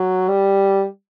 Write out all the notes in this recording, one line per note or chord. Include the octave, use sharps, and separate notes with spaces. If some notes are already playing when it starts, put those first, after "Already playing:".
Already playing: F#3
G3